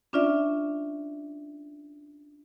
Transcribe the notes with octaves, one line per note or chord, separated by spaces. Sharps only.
C#4 D4 F4 D5 E5